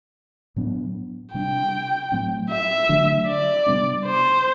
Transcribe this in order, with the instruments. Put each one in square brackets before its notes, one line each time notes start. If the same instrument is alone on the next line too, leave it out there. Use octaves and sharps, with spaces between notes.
[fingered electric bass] A2 F#3 B3 D4
[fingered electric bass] C3 G3 D4 [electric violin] G5
[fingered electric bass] A2 F#3 A3 C4
[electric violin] E5
[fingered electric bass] D3 F#3 A3 D4
[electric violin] D5
[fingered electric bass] C3 G3 B3 D4
[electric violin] C5